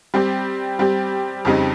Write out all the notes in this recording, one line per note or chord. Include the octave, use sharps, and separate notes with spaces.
G3 C4 G4
G3 C4 G4
F2 C#3 G3 C4 D#4